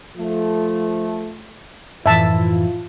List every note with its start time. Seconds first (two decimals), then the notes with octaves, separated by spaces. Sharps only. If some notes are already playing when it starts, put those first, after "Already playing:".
0.17 F3 A3
2.06 F#2 A2 E3 F3 E4 F4 E5 A5